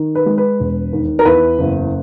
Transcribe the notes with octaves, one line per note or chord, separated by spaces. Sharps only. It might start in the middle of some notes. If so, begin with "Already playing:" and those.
Already playing: D#3
B4
G#3
B4
E1
D#2
A#4
E2 B4
F#1